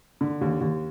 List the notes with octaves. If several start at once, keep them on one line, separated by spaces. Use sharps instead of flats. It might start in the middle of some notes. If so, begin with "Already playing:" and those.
D3
D#2
D#2